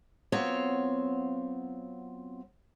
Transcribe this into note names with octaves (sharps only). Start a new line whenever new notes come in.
F#3 B3 C4 F4 C#5 F5